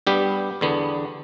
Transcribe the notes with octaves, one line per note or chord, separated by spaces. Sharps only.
G2 G3 B3 G4
E2 D3 B3